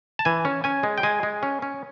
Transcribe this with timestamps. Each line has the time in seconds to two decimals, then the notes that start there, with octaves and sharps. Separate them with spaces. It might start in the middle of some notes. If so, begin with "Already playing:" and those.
0.19 A5
0.25 E3 G#5
0.45 C#4
0.64 C#4 G#5
0.83 G#3
0.98 G5
1.03 G#3 G#5
1.23 G#3
1.43 C#4
1.62 C#4